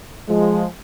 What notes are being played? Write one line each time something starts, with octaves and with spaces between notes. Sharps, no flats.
F3 G#3